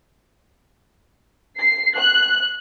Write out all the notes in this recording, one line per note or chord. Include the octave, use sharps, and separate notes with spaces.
C7
F#6